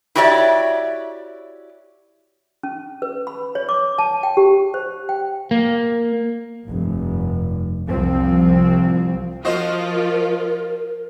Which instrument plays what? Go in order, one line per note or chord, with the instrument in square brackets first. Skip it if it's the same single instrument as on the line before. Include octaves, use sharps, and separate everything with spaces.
[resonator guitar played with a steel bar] E4 F#4 G4 C#5 D5 E5
[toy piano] C#4
B4
B5
C#5
D6
A5
G5
G4
C5
G5
[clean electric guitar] A#3
[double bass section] F1 G2
C2 F3 C4
[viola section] F3 F4 [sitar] F#4 C5 D#5 [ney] A#4